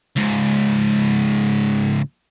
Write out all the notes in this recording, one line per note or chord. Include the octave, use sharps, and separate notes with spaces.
C#2 G#2